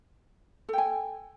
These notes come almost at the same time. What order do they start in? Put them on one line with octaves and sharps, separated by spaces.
A4 G5 G#5